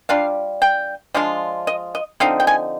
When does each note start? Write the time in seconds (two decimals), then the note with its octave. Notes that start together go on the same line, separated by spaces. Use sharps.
0.09 G3 D4 F4 F5
0.62 G5
1.14 F3 G#3 D4 F4
1.67 D#5
1.95 D#5
2.20 D3 F3 C4 D#4 F5
2.40 G5
2.47 G#5